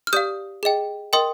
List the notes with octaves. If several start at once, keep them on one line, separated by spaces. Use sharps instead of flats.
F6
G4 D5 F5 D#6 G6
G#4 D#5 G5
A#4 D#5 G5 C6 D#6